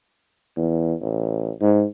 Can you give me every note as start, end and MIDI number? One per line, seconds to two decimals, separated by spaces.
0.57 0.93 40
1.01 1.50 33
1.61 1.84 44